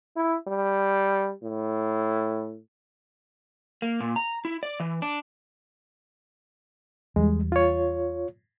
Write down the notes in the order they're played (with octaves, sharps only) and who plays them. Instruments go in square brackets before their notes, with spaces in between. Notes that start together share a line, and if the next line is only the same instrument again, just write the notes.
[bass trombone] E4
G3
A2
[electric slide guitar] A#3
A#2
A#5
E4
D5
E3
D4
[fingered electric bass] E2 G3 [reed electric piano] G#3
[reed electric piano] F4 C#5